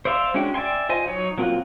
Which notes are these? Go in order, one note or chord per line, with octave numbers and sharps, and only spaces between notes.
C5 D5 E5 F5 C6
G#3 C#4 D4 F#4 G5
D5 E5 G5 G#5 C6
F4 C5 D#5 G#5
F#3 D#4 C#5
F#3 A#3 C4 F4 F#4